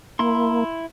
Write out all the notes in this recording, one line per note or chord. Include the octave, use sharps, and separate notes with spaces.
A#3 E4 C6